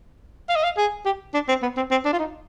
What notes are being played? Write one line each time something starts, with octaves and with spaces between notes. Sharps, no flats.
F5
D#5
F5
G#4
G4
D4
C4
B3
C4
C4
D4
F4
D#4